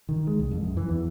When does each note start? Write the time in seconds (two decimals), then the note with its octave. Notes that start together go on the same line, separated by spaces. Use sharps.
0.09 D#3
0.27 G#3
0.39 C2
0.51 F2
0.63 F#2
0.77 E3
0.89 E2